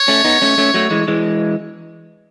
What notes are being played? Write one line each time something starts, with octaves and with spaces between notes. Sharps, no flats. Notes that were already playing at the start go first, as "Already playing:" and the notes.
Already playing: C#5
A3 C#4
B3 D#4
A3 C#4
A3 C#4
F#3 A3
E3 G#3
E3 G#3